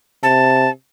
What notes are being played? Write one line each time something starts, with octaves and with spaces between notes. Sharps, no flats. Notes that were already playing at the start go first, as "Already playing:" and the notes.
C3 A5